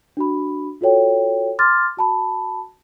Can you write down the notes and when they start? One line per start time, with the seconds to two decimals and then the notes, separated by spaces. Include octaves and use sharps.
0.17 D4 F#4 B5
0.81 F4 F#4 A4 C#5 G5
1.59 C6 D6 F6 A6
1.97 F#4 A5 B5